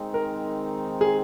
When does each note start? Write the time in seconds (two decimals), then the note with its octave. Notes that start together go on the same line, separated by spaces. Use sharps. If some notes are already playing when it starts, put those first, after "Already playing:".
Already playing: D#3 G#3 C4 D#4
0.14 A#4
1.01 G#4